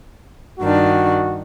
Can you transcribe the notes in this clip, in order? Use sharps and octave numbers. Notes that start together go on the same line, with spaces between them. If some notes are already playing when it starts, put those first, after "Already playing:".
G2 D#3 D4 F#4